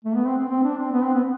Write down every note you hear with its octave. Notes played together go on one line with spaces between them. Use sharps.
A3
B3
C4
C4
C4
D4
C4
B3
C4
B3